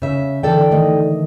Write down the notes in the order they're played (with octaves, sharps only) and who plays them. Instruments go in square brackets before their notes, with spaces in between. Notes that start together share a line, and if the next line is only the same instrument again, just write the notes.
[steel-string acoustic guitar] C#3 E5
[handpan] D3 E3 [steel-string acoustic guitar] A4 D5 G5
[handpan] D#3 A3 D#5